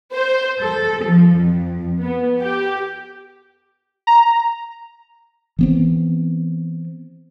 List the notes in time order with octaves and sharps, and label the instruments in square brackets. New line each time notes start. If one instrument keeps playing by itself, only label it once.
[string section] C5
A4
F3
F2
B3
G4
[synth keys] A#5
[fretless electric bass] E3 B3 C4